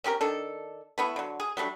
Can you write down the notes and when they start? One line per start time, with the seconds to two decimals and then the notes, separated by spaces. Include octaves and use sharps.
0.04 C4 C#4 G4 A#4
0.21 D#3 D4 A4
0.98 A3 B3 E4
1.16 D3 F#3
1.40 G#4
1.57 F#3 G3 A3 D4